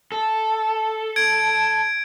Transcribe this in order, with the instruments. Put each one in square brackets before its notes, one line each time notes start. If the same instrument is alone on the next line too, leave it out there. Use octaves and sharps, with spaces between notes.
[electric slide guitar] A4
[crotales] G#6 D7